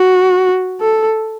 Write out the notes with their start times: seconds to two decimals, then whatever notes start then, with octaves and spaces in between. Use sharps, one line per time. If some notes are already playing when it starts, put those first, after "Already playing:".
Already playing: F#4
0.81 A4